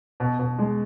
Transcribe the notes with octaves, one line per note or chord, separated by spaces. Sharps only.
B2
B2
G#3